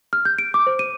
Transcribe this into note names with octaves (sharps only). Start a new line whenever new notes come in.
F6
G6
D7
D6
C5
D#7